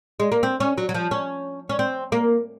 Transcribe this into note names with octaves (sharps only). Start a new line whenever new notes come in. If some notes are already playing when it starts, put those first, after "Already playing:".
G#3
A#3
C4
C#4
F#3
F#3
F3
C#4
C#4
C4
A#3